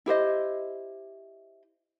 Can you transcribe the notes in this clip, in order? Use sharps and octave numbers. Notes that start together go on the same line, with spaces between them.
E4 G4 C5 D#5